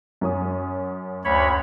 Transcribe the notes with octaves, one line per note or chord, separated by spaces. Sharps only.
F#2 C#4 D#6
D2 C#5 B5